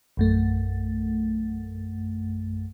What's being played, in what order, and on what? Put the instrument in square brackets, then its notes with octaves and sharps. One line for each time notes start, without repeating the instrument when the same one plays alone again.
[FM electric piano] A#1 F#2 A3